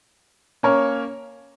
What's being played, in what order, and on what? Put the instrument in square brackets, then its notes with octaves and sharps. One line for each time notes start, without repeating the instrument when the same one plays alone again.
[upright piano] A#3 C#4 A#4 C#5